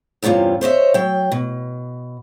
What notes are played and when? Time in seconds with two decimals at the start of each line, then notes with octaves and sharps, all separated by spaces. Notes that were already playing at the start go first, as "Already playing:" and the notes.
0.23 E2 G2 C3 C#4 F4
0.61 C5 C#5 D#5 E5
0.94 F#3 G5
1.32 B2